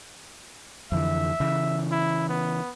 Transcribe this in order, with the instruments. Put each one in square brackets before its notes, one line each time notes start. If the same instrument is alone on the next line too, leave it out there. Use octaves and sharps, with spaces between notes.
[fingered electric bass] F2 D3 E3 [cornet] E5
[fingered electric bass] C#3 E3
[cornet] E4
B3